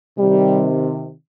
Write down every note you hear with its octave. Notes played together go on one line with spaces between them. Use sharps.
C3 D#3 G3